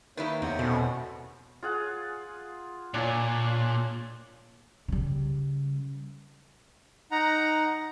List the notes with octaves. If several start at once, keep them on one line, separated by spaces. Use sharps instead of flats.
D#3 G3 A#3 D#4 E4 B4 C#5
E2 C3 C4 F#5
B2 A3 C#4 E4 C5
F4 G#4 F#5
A#2 D4 F4 C#5
C#3 G3
D#4 F#5 A#5